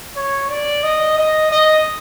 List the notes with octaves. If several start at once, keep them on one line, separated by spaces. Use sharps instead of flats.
C#5
D5
D#5
D#5
D#5